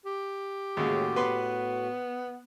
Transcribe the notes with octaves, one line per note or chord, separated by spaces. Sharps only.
G4
D#2 A2 C#3 G#3 F#4
B3 B4 C6